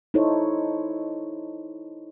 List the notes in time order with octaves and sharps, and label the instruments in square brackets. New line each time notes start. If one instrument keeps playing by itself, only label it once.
[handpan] D#4 E4 A4 C5 C#5